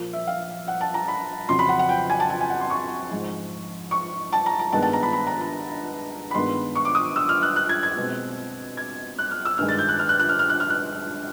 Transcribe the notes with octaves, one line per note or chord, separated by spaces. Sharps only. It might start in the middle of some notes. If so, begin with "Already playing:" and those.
Already playing: A#2 F3 A#3
E5
F5
F#5
A5
A#5
B5
F2 C#3 F#3 C6
B5
F#5
F#5
G5
G#5
A5
A5
G#5
F#5
C6
C#6
G#2 F3 G#3
C#6
A5
A#5
A#5
G2 D#3 G#3 B3 A5
A5
A#5
B5
B5
A#5
B5
B5
G2 D#3 G#3 B3 C6
C#6
D6
D#6
E6
F6
F#6
F#6
G#6
G#6
B2 G#3 C4
G#6
F#6
F6
E6
G2 D#3 G#3 F6
A6
G6
F#6
F6
F#6
F#6
F6
F6
F#6
F6
F#6